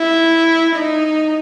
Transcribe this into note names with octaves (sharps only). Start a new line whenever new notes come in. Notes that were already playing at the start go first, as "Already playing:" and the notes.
Already playing: E4
D#4